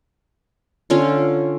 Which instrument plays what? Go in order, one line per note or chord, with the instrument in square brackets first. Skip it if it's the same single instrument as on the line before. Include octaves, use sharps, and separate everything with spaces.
[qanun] D3 C#4 F4